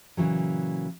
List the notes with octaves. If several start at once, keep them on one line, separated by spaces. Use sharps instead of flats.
A#2 C#3 E3 F#3